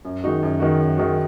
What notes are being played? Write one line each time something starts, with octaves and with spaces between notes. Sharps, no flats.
F#2
D#3 G#3 D#4 F#4
F#2
D#3 G#3 D#4 F#4
F#2
D#3 G#3 D#4 F#4